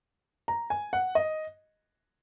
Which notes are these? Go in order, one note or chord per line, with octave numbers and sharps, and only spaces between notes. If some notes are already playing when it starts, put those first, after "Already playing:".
A#5
G#5
F#5
D#5